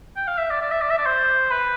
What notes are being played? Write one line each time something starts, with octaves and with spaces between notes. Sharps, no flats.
G5
F5
E5
D5
D5
E5
D5
E5
D5
C5
B4